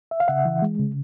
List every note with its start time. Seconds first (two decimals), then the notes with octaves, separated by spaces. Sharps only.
0.11 E5
0.20 F5
0.28 C#3 E5 F#5
0.45 E3
0.62 G#3
0.79 C#3